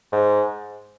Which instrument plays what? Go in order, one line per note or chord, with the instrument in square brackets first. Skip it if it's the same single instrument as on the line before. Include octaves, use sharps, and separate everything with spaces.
[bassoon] G#2